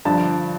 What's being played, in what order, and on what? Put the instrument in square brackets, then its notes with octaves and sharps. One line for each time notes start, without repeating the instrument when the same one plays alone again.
[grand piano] G2 D3 F3 A5